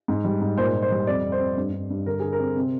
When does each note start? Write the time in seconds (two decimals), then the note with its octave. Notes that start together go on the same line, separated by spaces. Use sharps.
0.08 G#2
0.24 G3
0.41 G#2
0.58 A#2 C5
0.75 A#2
0.82 C5
0.91 G3
1.07 F2 D5
1.24 F2
1.32 C5
1.40 C4
1.57 G2
1.73 G2
1.90 G2
2.06 D3 A#4
2.20 D3 G#4
2.33 A#4
2.40 C4
2.56 C3